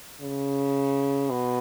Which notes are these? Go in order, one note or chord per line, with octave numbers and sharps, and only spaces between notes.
C#3
B2